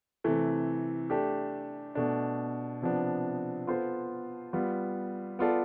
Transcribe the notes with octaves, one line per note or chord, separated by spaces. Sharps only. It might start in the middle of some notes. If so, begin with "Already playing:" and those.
C3 E3 A3
A3 D4 G4
B2 A3 D4
C3 F3 B3 D4
B3 F4 A4 C5
G3 B3 F4
B3 F4 A4 D5